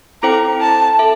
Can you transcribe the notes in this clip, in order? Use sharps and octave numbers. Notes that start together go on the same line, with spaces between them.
C4 E4 A4 C5 G5 A#5
A5
A4 E5